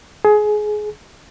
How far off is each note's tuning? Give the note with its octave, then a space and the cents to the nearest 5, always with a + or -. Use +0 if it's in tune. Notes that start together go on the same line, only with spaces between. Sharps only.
G#4 +20